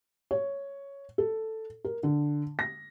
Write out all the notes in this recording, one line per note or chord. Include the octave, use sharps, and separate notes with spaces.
C#5
A4
A#4
D3
A#6